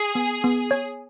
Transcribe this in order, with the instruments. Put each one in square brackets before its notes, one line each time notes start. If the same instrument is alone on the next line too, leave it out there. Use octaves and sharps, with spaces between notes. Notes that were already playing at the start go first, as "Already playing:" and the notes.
Already playing: [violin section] G#4
[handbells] B3
B3
C#5